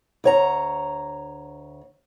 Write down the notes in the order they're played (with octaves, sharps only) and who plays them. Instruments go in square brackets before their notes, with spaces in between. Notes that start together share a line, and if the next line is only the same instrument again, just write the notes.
[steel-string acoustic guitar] D2 C#5 A#5